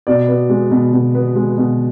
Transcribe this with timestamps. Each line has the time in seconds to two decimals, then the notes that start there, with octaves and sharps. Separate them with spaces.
0.07 B2 D5
0.28 B3
0.50 G#3
0.71 B2
0.93 B2
1.15 B3
1.35 G#3
1.58 B2